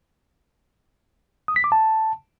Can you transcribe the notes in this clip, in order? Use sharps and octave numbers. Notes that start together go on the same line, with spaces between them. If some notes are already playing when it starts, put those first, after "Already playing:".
D#6
B6
D6
A5